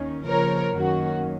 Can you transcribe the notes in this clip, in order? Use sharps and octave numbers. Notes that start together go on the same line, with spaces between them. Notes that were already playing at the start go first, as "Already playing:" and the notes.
Already playing: D#2 D#3 C#4
C#3 F3 A#3 A#4 C#5
F#2 D#3 A#3 C#4 F#4